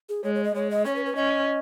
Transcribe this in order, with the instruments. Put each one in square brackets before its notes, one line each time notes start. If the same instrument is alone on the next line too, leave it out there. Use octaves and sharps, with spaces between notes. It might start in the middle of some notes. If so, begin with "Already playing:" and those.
[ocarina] G#4
[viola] G#3 [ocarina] C#5
[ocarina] C#5
D#5
[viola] G#3 [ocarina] C#5
[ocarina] D#5
[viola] C#4 [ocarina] C#5
[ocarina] B4
B4
[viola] C#4 [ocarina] D#5